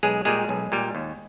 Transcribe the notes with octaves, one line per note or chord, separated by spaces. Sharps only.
B1 G#3 G#4
A#2 G3 G#3 G#4
B1
A#2 G3
D#2